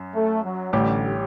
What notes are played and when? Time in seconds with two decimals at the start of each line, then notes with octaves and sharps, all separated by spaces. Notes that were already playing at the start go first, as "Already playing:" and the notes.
Already playing: F#2
0.14 A3
0.43 F#3
0.73 A1 A2 D3 G3 C#4 G4